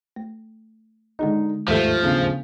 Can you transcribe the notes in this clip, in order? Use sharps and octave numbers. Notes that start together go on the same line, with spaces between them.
A3
D3 G#3 D#4 G#4 D#5
D#2 G#2 F3 A3 G4 G6 B6
C#3 B3 D4